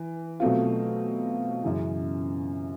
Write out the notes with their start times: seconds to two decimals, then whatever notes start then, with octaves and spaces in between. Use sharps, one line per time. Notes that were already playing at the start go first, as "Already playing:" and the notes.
Already playing: E3
0.40 B2 F#3 A3 C4 F4
1.63 F#2 C#3 E3